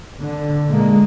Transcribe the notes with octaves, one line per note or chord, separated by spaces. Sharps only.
D3
A#2 D3 G#3 A#3